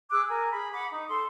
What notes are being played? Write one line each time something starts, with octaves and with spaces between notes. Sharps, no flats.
G#4 D6 E6 F#6
A#4 G#5
G#4 B5
F#5 B5 D6
D#4
A4 C6